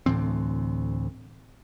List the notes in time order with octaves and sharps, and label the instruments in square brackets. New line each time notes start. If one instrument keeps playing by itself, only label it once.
[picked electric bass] D2 A2 E3 C4